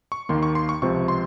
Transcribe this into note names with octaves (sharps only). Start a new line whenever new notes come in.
C#6
D#2 D#3 A#3 C6
C#6
C6
C#6
C#2 C3 F3 C4 C#6
C6